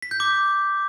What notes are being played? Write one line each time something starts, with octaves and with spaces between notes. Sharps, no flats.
B6
G6
D6